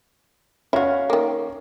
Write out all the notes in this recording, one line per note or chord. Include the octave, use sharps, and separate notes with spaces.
C#4 E4 F#4 F5
D#3 A#3